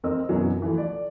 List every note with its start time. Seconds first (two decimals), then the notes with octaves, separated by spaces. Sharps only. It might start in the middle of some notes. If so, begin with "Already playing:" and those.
0.04 F2 C4 A#4 D#5 E6
0.29 F#2 B2 E3 F#3
0.62 E3 F3 A3
0.78 D5